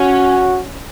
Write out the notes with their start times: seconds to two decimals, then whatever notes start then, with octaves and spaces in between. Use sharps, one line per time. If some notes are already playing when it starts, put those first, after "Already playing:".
Already playing: C#4 F#4